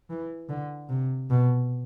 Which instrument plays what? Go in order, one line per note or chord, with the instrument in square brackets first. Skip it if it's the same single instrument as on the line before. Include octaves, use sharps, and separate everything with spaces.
[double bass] E3
D3
C3
B2